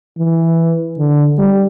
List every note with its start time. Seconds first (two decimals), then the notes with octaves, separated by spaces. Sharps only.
0.18 E3
0.98 D3
1.38 G3